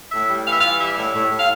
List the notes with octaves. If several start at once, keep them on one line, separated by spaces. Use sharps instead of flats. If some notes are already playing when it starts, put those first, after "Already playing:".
A2 E5
G3
E3 F5
E5
E3 F5
G3 E5
A2
A2
A2
F5